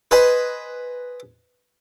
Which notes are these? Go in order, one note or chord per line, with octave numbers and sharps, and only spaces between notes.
B4 C5 D#5 G#5